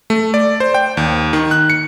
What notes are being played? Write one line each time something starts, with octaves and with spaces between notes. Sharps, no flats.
A3
D5
C5
G5
D#2
D#3
F#6
C#7